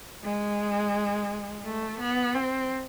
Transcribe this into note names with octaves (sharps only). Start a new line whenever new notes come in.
G#3
A3
B3
C4